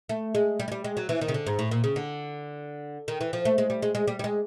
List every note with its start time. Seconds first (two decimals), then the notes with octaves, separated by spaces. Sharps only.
0.09 A3
0.35 G#3
0.60 G3
0.68 G#3
0.72 G3
0.84 G#3
0.97 F#3
1.09 E3
1.21 D#3
1.28 C#3
1.34 D3
1.47 G#2
1.59 A2
1.71 A#2
1.84 C#3
1.96 D3
3.08 D#3
3.21 E3
3.33 F3
3.45 A3
3.58 G#3
3.70 G3
3.82 G#3
3.95 G#3
4.07 G3
4.19 G3
4.24 G#3